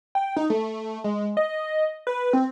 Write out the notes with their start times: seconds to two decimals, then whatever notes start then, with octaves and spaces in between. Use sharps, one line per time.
0.15 G5
0.36 D#4
0.50 A3
1.04 G#3
1.37 D#5
2.07 B4
2.33 C4